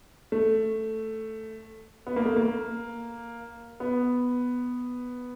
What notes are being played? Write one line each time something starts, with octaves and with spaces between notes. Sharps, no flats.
A3
B3
A#3
A3
A#3
B3